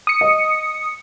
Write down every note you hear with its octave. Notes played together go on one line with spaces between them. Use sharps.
D#6 C#7
D#5